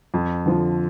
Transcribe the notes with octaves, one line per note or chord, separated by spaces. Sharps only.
F2
D3 F3